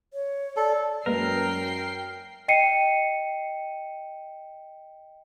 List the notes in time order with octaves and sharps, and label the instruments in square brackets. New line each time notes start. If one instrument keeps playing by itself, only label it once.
[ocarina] C#5
[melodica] A4 [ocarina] D5
[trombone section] F#2 [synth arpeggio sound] G#3 A#3 B4 [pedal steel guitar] A#4 [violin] G5 C7
[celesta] D#5 G5 C7 C#7 D#7